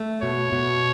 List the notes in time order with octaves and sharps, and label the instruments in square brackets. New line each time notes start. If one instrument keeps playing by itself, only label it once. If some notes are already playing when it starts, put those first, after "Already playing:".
Already playing: [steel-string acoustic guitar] A3
[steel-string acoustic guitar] B2 [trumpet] C#5
[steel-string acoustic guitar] B2